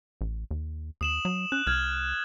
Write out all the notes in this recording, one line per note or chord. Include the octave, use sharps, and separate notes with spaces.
A1
D#2
D#2 D#6 E7 F#7
F#3
C#4 F#6
C2 F6 G#6